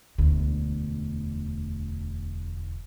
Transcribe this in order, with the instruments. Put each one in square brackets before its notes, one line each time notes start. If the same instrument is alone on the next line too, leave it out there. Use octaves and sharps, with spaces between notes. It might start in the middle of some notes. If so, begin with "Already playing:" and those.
[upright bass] E1 D2